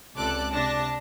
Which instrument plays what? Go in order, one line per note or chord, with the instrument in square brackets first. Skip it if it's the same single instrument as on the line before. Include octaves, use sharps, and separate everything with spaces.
[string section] C#2 C3 A4 D5 D6 F#6
C3 D4 A5 A#6